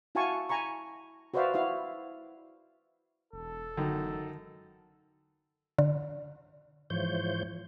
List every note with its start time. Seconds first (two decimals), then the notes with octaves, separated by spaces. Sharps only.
0.15 E4 F#4 F5 G#5 A5 C#6
0.49 G#5 A#5 B5 C#6
1.34 F#4 B4 C5 D5 E5 F5
1.54 E4 F#4 F5
3.33 E1 A4
3.77 F#2 D3 D#3
5.78 D3
6.90 G#2 E3 F3 C5 C#5 G6